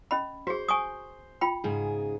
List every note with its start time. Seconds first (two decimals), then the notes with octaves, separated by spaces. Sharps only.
0.11 C#4 D#5 B5
0.47 F#4 G#4 C5
0.68 G#5 C#6 D#6
1.41 F4 G5 B5
1.64 G#2 C#3 G#4